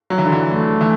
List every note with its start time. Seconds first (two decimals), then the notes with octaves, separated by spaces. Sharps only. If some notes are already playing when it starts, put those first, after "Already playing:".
0.10 F#3
0.18 E3
0.25 D3
0.32 E3
0.45 A3
0.81 E3